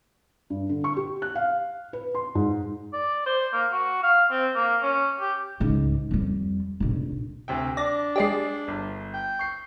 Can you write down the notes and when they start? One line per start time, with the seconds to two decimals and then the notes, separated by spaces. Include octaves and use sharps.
0.50 G2
0.69 D3
0.84 C#6
0.97 G4
1.22 F#6
1.35 F5
1.93 B4
2.15 C6
2.35 G#2
2.93 D5
3.26 C5
3.53 A#3
3.72 F#4
4.03 F5
4.31 C4
4.55 A#3
4.82 C#4
5.20 G4
5.60 C#2 G#2
6.11 F2 G3
6.80 F1 A#1
7.48 D2 C3 G5
7.77 D4 D5 A#6
8.16 G#3 G4 G#4 D5 C7
8.68 G1
9.14 G5
9.39 C#6 C7